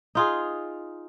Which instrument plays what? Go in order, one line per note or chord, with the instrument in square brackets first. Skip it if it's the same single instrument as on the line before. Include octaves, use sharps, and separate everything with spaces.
[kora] D#4 F4 G#4